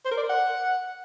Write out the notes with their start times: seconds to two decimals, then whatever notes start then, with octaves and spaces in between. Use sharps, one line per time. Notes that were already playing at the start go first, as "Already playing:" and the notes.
0.05 C5
0.11 A#4
0.17 D5
0.23 A#4
0.29 F#5